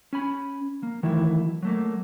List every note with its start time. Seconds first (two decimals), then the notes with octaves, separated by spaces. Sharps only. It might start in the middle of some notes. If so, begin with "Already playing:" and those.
0.13 C#4 G#5 B5
0.83 A#3
1.03 D#3 E3 F#3 A3 E4
1.63 F#3 A3 A#3